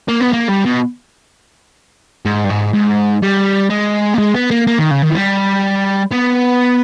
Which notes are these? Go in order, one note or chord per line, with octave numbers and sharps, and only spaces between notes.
A#3
B3
A#3
G3
B2
G#2
G2
G#2
G#2
G3
G#3
A#3
G#3
B3
A#3
A#3
D#3
C#3
D#3
E3
G3
B3